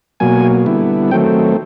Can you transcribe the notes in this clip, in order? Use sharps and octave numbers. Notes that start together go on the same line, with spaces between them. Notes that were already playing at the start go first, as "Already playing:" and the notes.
B2 F#3 A#3 G#5
D3 G3 B3 E4
D#3 F#3 A3 C4 G5